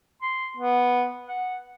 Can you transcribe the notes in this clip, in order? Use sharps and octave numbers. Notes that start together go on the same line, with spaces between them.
C6
B3
F#5